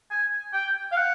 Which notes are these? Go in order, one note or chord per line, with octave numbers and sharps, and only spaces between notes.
G#5
G5
F5
F#5